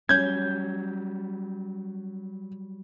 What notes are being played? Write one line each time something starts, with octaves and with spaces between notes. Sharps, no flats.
F#3 G3 C#4 G6 G#6